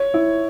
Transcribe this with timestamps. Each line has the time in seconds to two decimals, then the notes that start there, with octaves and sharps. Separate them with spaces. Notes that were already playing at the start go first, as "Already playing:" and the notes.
Already playing: C#5
0.14 E4